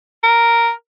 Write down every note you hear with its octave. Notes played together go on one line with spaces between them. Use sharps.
A#4